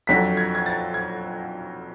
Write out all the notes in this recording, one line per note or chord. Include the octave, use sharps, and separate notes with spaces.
F2 D3 F#3 B6
G#6
G#6
A6
G#6